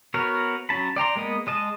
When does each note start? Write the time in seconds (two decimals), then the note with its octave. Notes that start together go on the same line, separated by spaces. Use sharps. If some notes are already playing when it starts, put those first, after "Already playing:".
0.14 B3 F#4 A#4 B4 C#5
0.69 F#3 C#4 A5 B5
0.96 D5 G5 A#5 C6
1.16 G#3 A#3 B3 D#5
1.47 G#3 D#5 A5